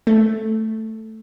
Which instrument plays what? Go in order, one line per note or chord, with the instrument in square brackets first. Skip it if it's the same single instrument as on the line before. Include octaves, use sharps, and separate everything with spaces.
[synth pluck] A3